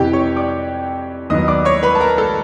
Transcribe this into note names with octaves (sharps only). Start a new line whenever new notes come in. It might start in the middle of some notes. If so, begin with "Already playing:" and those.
Already playing: F2 C3 E3 G4 G5
C#5 C#6
D5 D6
D#2 D#3 F#3 B3 D#5 D#6
D5 D6
C#5 C#6
B4 B5
A5
A#4 A#5
A4 A5